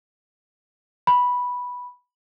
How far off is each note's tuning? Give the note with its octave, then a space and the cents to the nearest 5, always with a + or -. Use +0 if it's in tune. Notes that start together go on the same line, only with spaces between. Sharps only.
B5 -5